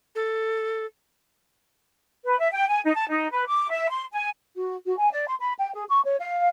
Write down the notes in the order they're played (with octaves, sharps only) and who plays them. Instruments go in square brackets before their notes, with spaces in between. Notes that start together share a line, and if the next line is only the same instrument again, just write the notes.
[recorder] A4
[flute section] B4
E5
G5
G#5
D#4
A5
D#4
B4
D6
E5
C6
G#5
F#4
F#4
G#5
D5
C6
B5
G5
G#4
C#6
C#5
F5